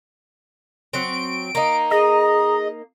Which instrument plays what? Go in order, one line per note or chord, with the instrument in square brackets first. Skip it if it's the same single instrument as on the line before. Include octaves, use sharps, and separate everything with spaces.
[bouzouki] F#3 C4 [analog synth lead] D7
[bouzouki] A#3 D#4 [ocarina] A#5
[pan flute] G#4 [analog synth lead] D#5